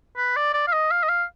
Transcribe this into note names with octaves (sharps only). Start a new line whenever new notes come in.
B4
D5
D5
F5
D#5
F5
D#5
F5